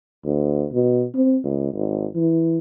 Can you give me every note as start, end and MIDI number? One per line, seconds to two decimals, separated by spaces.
0.25 0.66 38
0.72 1.05 47
1.15 1.38 60
1.44 1.73 37
1.73 2.06 32
2.15 2.58 52